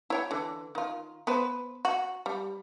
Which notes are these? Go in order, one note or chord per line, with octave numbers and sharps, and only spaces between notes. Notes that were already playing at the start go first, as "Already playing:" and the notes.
E4 C#5 G5
D3 E3
D#3 F4
B3 B4 C5
F#4
G3